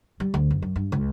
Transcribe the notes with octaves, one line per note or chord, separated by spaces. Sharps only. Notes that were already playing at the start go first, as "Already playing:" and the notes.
G3
D2
F#1
F#2
G2
C#2